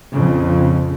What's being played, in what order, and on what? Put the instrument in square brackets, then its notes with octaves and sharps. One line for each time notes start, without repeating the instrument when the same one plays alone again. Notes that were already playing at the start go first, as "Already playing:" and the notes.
[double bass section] A#1 F2 C#3